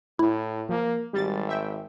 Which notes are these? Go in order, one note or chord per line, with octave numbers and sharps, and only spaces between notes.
A2 E4
F3 A#3
G#1 G3 A6
E5 G5